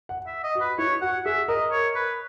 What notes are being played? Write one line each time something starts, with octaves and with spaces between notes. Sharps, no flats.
F#5
E5
D#5
F#4
B4
E4 C#5
F#4 F#5
G#4 E5
A#4 D#5
C#5
B4